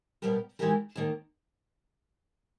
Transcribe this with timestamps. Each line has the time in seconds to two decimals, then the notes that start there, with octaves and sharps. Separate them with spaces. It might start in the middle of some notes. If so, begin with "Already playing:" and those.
0.22 B2 G3 B3 G4 A#4
0.59 E3 G#3 D#4 G4 A#4
0.95 D#2 D#3 A#3